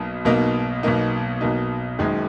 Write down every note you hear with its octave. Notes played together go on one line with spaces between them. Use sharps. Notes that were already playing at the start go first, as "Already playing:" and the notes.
Already playing: B1 B2 A#3 D#4
B1 B2 A#3 D#4
B1 B2 A#3 D#4
B1 B2 A#3 D#4
F#1 F#2 D#3 G#3